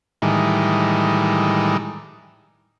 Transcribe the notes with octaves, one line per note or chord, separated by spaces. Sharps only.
A2 D#3 E3 G3 G#3